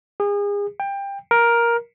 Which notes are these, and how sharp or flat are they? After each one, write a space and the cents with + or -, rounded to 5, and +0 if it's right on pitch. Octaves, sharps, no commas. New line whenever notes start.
G#4 -35
G5 +20
A#4 +10